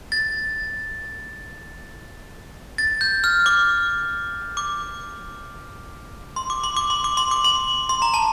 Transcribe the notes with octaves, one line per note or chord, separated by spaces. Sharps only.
A6
A6
G6
F6
D6
D6
C6
D6
C6
D6
C6
D6
C6
D6
C6
C6
A#5
A5